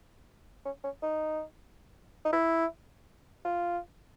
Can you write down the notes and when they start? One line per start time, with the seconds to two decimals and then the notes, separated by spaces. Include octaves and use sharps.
0.65 C#4
0.84 C#4
1.03 D#4
2.25 D#4
2.33 E4
3.45 F4